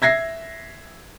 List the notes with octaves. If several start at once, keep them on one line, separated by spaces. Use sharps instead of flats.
E5 G#6 A#6 C7